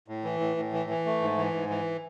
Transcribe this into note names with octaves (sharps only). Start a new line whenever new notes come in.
A2
E3
A2
A2
E3
E3
A3
G#2
E3
G#2
E3